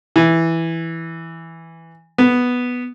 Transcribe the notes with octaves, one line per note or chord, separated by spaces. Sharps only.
E3
B3